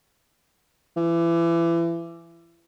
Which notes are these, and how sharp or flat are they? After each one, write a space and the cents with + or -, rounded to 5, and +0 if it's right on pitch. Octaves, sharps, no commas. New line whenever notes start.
E3 +30